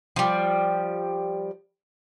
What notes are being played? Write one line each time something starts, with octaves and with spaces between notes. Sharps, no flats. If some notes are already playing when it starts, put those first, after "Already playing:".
F3 G3